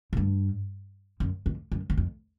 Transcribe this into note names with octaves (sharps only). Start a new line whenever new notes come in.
F#2
G2
F#2
F2
F#2
E2
F2